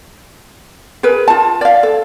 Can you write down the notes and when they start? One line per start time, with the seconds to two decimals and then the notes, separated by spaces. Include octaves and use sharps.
1.03 G#4 A#4 B4
1.28 F4 A5
1.61 D5 F5
1.83 A4